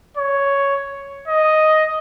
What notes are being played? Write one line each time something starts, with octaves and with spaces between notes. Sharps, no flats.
C#5
D#5